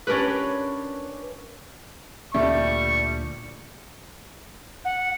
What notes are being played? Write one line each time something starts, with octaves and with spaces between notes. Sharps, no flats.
C#4 D4 G4 A#4 B4
D2 A#2 G3 A3 C#6
F#5